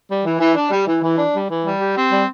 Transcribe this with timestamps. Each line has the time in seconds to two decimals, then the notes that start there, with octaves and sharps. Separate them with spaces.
0.08 G3
0.25 E3
0.40 E3
0.55 D4
0.70 G3
0.86 E3
1.02 E3
1.18 D4
1.33 G3
1.49 E3
1.64 G3
1.80 G4
1.95 C4
2.10 G3